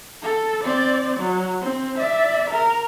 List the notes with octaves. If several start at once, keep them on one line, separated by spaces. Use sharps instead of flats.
A4
C4 D5
F#3
C4
D5 E5
A#4